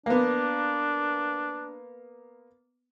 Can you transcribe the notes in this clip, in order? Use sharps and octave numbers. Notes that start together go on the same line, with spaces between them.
A#3 B3 D4